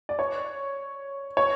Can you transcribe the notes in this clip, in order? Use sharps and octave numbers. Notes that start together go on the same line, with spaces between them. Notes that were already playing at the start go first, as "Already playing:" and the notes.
D5
C#5
C#5